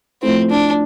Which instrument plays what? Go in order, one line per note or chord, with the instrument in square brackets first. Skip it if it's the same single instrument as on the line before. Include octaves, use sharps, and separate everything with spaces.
[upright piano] A2 F3 A3 E4 [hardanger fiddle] C4
[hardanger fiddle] D4